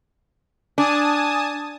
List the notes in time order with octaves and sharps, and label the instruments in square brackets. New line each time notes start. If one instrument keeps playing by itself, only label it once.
[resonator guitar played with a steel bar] D4 [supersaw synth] G#5 A5 D#6